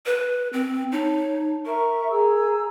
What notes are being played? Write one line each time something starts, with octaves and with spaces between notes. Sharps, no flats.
B4
C4
D#4 C#5 A5
A#4 E5 A#5 C#6
G#4 A#5 E6